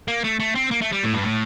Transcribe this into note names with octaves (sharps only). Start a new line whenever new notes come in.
A#3
A3
A3
C4
A#3
A3
G3
A2
G2
A2